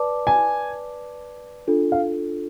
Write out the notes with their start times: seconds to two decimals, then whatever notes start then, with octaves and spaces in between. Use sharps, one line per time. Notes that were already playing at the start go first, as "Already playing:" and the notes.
Already playing: B4 D5 A5 D6
0.27 G#5
1.67 D4 F4 A4
1.92 F5